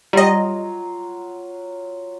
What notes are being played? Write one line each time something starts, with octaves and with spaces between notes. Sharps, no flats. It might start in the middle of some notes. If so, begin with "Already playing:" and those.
F#3 G3 F4 D#5